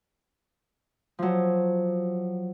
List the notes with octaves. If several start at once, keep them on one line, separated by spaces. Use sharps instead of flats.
F3 F#3